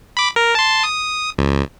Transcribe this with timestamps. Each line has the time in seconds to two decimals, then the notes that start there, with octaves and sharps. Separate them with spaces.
0.17 B5 D6
0.36 A#4
0.55 A5 C6
0.84 D#6
1.38 C#2